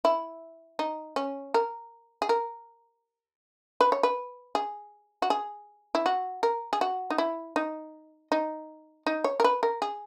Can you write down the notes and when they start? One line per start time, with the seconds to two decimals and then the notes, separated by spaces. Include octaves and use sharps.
0.05 E4
0.79 D#4
1.16 C#4
1.54 A#4
2.22 G#4
2.29 A#4
3.81 B4
3.92 C#5
4.03 B4
4.55 G#4
5.22 F#4
5.30 G#4
5.95 E4
6.06 F#4
6.43 A#4
6.73 G#4
6.81 F#4
7.10 D#4
7.18 E4
7.56 D#4
8.32 D#4
9.07 D#4
9.24 C#5
9.40 A#4
9.44 B4
9.63 A#4
9.82 G#4